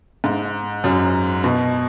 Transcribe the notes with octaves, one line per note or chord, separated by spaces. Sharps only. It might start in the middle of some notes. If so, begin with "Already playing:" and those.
G#2
F#2
B2